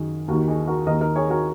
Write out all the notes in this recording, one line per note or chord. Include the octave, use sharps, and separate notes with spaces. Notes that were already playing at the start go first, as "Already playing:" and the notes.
Already playing: F#2 D#3 G#4
D#2 D#3 F#4 A#4
D#4 G#4
F#4 A#4
D#2 D#3 A#4 D#5
A#4 D#5
G#4 C#5
F#4 A#4